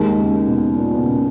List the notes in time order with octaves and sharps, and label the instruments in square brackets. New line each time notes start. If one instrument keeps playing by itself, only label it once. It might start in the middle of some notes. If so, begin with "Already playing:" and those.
Already playing: [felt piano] D#2 D#3 G#3
[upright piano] C#3
B2
A#2
B2
C#3